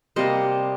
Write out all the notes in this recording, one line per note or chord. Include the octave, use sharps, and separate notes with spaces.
C3 G3 A#3 C5 D#5